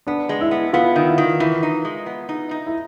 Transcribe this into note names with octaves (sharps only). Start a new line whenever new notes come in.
B3 D4
G#3
E4
B3
B3 F4
D#3
E4
D#3
E3 E4
D#4
G#3
B3
D#4
D#4
E4